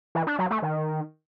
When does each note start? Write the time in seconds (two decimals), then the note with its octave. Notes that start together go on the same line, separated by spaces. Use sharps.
0.15 E3
0.27 D4
0.39 F#3
0.51 A3
0.62 D#3